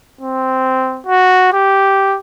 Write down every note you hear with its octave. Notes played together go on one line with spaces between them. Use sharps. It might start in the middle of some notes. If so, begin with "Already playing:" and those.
C4
F#4
G4